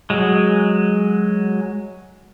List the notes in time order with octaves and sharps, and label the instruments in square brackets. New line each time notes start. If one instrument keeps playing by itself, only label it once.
[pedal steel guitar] F#3 G#3